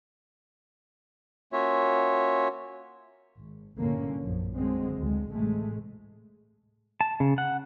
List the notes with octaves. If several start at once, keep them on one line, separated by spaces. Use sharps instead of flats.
A#3 C#4 F4 F#4 C#5 E5
G#1
C2 G2 A#2 D3 A#3 C#4
A#1 F#2 F3
D3 F#3 G#3 C4
D2 G#3
A1 C3 G#3 A3
A5
C#3
F#5